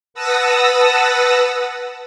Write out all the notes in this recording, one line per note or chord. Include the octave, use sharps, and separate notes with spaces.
B4 F#5 A5 D#6 E6 A#6